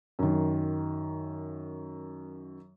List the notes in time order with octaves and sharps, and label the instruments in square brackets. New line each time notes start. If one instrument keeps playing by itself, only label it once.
[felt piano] F#2 D#3